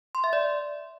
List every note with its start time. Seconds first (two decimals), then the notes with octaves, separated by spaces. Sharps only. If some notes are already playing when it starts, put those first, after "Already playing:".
0.15 C6
0.24 E5
0.33 D5